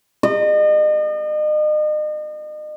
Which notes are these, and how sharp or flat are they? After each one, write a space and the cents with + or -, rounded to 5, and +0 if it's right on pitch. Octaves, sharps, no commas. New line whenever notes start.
D#5 -40